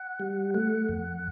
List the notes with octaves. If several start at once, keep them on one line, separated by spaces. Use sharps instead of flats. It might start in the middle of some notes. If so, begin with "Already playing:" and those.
Already playing: F#5
G3
A3 F#5
F2